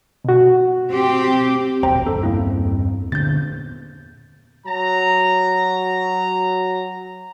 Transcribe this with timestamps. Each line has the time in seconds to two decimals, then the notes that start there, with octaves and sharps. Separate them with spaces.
0.25 B2 F#4
0.90 C4 G4
1.83 E1 A#1 B2 C5 G5 A#5
2.06 E2 G2 C4 A4
2.23 A#3 E4
3.12 A#2 D3 B3 G6 A6
4.67 F#3 A#5